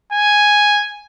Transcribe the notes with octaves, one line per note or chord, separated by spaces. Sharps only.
G#5